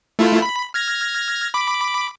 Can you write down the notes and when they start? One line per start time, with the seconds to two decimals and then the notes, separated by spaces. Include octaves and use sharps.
0.19 A3 E4 F4
0.42 B5
0.74 F6 G#6 A#6
1.54 B5 D6